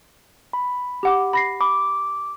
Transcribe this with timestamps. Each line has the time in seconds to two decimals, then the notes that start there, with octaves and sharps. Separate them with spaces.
0.53 B5
1.03 G4 F#5 D6
1.33 B5 A#6 C7
1.61 B5 D6